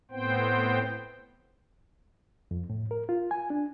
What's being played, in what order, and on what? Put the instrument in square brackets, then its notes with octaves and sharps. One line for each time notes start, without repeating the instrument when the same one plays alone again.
[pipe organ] A2 B3 C4 C5 G5
[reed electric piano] F2
A2
A#4
F4
G#5
D4